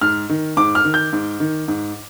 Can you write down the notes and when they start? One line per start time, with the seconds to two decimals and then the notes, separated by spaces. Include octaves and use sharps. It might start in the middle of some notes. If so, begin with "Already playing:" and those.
0.01 G#2 F6
0.29 D#3
0.57 G#2 D6
0.75 F6
0.85 D#3
0.94 G6
1.13 G#2
1.40 D#3
1.68 G#2